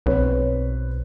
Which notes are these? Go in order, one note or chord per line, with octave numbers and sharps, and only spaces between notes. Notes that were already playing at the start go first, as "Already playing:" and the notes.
B1 C4 B4 C#5